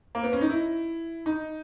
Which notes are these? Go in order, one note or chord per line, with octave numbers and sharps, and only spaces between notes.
A#3
B3
C#4
D#4
E4
D#4